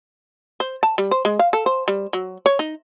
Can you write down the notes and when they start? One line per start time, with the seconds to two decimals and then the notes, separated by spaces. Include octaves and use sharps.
0.60 C5
0.83 A5
0.98 G3
1.11 C5
1.25 G#3
1.39 F5
1.53 A4
1.66 C5
1.88 G3
2.13 F#3
2.46 C#5
2.59 D#4